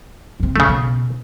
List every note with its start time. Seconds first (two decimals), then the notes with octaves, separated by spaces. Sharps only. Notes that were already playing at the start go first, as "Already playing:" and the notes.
0.40 G2 C3
0.56 D#1 D#2 C#3 A3
0.69 B2